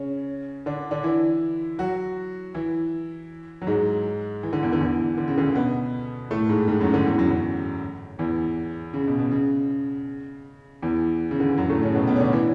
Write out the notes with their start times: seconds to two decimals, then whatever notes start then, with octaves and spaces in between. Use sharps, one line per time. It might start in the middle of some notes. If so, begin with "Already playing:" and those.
Already playing: C#3 C#4
0.66 D3 D4
0.91 D3 D4
1.03 E3 E4
1.79 F#3 F#4
2.54 E3 E4
3.62 F#3
3.67 G#2 G#3
4.43 E3
4.53 D3
4.63 E2 E3
4.73 D3
4.80 E2 E3
5.18 D3
5.27 C#3
5.38 D2 D3
5.55 B2 B3
6.31 A2 A3
6.49 G#2 G#3
6.68 G#2 G#3
6.80 F#2 F#3
6.94 D2 D3
7.05 E2 E3
7.18 F#2 F#3
7.30 F#2 F#3
8.19 E2 E3
8.94 C#3
9.07 B2
9.19 B2
9.31 C#3
10.82 E2 E3
11.31 C#3
11.40 D3
11.49 E3
11.58 F#2 F#3
11.70 A2 A3
11.83 C#3 C#4
11.95 B2 B3
12.07 B2 B3
12.16 C#4
12.20 D3 D4
12.32 E3 E4